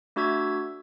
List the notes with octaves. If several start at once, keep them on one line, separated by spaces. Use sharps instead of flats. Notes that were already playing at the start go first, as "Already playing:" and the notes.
A3 D4 F#4 E5 E6 G#6